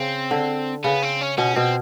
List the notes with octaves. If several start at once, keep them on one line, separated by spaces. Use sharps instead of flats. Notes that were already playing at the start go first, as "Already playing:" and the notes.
Already playing: C#3 C4
D3
C#3 B3
C4
C#4
B2 C#4
B2 C4